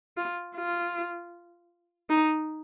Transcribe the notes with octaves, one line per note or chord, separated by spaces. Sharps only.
F4
F4
D#4